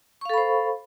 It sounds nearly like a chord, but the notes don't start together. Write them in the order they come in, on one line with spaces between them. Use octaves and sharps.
C#6 F5 A4 B5 C5